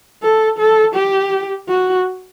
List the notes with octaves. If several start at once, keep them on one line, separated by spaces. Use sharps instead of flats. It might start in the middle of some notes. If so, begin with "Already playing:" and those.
A4
A4
G4
F#4